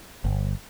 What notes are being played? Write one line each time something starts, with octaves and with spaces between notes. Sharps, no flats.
G1